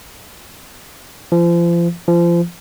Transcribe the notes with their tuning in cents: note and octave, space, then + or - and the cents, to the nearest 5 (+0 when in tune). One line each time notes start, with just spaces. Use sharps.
F3 -35
F3 -30